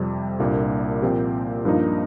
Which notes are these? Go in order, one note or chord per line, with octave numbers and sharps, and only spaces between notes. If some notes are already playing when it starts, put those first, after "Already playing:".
Already playing: F2 C3 G3
C2 A#2 G3 A#3 D4
A#2 F3 C4 G4
G2 F3 A#3 D#4